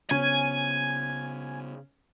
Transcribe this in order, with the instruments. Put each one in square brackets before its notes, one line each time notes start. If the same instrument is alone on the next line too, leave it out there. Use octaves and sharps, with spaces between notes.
[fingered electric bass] C#3 B3 [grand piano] C#4 [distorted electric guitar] G#5